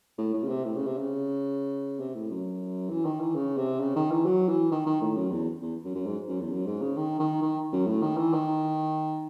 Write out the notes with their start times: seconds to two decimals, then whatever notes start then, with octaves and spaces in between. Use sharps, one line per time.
0.18 A2
0.34 A2
0.43 C#3
0.49 C3
0.65 A2
0.76 C#3
0.86 C3
0.98 C#3
2.00 C3
2.15 A2
2.30 F#2
2.90 E3
3.05 D#3
3.20 E3
3.35 C#3
3.58 C3
3.80 C#3
3.96 D#3
4.11 E3
4.25 F#3
4.49 E3
4.72 D#3
4.86 D#3
5.01 A2
5.17 F#2
5.31 E2
5.62 E2
5.85 F#2
5.95 F#2
6.06 G#2
6.29 F#2
6.40 E2
6.52 F#2
6.67 G#2
6.82 C#3
6.96 D#3
7.20 D#3
7.42 D#3
7.73 F#2
7.87 A2
8.02 D#3
8.17 E3
8.33 D#3